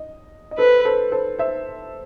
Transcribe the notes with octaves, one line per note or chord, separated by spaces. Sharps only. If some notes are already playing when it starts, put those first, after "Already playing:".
Already playing: D#5
D#5
A4 B4 C5
A4 C5
A4 C5
C5 E5